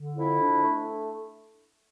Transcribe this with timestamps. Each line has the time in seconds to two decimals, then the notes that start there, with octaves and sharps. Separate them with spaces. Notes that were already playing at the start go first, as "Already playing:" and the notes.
Already playing: D3
0.16 F2 E4
0.39 D4
0.63 A3